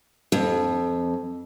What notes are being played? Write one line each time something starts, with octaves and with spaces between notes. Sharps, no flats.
F2